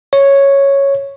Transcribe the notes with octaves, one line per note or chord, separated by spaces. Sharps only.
C#5